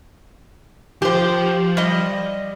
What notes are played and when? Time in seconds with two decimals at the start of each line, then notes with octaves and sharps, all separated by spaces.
1.02 F3 G4 C5
1.77 G3 D#5